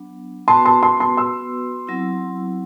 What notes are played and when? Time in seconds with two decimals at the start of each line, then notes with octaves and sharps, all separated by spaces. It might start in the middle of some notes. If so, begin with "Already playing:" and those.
Already playing: F#3 B3 D4
0.48 B3 F#4 B4 A5 C6
0.65 A5 C6
0.83 A5 C6
1.00 A5 C6
1.17 C6 E6
1.87 F#3 C4 E4